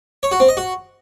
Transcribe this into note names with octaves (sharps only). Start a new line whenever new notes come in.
C#5
F#4
C4
D#5
F#4